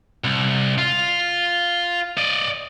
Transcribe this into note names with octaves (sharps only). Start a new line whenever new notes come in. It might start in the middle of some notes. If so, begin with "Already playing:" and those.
C2
F4
D5 D#5